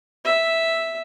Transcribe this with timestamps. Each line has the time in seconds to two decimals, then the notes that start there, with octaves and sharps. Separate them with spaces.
0.25 E5